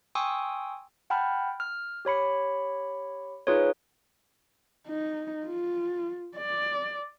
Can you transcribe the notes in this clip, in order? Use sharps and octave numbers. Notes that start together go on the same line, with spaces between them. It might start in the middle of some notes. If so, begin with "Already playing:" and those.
G5 G#5 C6 C#6 D#6 E6
F#5 G5 A5 B5 F6
F6
G4 C#5 B5 C#7
D#4 F4 G#4 B4 C#5
D#4
F4
D5